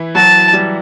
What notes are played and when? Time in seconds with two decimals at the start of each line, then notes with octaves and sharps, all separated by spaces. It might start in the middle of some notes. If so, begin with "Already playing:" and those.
Already playing: E3 E4
0.15 F#3 F#4 A5
0.53 G3 G4